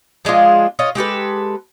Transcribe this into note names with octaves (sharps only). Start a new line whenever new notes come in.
F3 G#3 D4 F4
F4 C#5 D#5
G#3 G4 A4 B4